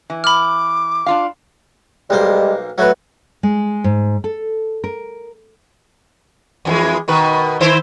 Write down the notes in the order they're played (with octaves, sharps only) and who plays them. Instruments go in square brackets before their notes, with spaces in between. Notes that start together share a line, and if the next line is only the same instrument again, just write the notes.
[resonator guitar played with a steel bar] E3
[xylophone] B5 F6 [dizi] D6
[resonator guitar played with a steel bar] D4 F4 F5
[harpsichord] B1 A#3 C5 [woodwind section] G3 G#3
[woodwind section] F#3 [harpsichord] A3 F#4 B4
[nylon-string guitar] G#3
G#2
A4
A#4
[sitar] F2 E3 G#3
B2 D#3 B4
D#3 E4 C5